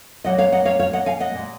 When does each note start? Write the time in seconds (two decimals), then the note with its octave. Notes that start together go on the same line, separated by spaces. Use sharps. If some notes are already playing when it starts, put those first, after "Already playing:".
0.24 A#2 F#3 A#3 D#5 F#5
0.38 C#5 F5
0.53 D#5 F#5
0.66 C#5 F5
0.79 C#5 F5
0.93 D#5 F#5
1.06 F5 G#5
1.20 D#5 F#5
1.34 A#2 G#3